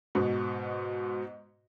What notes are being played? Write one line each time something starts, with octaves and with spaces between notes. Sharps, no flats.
G#2 B2